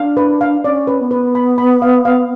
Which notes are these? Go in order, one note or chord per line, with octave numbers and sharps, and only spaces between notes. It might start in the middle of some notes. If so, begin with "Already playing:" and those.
Already playing: D4 F5
B4
F5
C#4 D5
B4
B3
B4
B5
B5
F5
F5